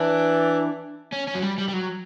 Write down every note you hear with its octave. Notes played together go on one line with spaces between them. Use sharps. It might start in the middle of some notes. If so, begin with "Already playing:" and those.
Already playing: E3 D4
C#4
C#4
F#3
G3
G3
G3
F#3